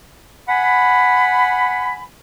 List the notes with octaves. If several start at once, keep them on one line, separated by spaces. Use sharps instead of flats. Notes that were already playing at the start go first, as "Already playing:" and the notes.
F#5 G#5 B5